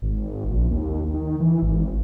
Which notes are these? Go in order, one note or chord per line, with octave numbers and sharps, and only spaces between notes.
G#1
A#1
D#2
D#3
E3
G#1